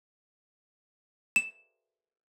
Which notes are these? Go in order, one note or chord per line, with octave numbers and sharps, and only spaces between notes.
E7